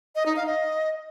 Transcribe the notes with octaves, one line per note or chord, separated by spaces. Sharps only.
D#5
D#4
F5
D#5